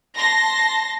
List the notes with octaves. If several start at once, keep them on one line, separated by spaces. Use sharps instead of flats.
A5 C6 A#6